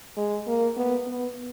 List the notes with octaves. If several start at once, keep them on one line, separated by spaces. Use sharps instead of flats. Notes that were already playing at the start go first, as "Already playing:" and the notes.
G#3
A#3
B3
B3